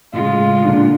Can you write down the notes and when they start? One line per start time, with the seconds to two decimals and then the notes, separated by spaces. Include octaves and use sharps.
0.13 A2 C#3 G#3 F4
0.65 A#2 D3